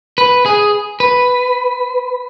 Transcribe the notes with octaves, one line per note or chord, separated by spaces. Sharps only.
B4
G#4
B4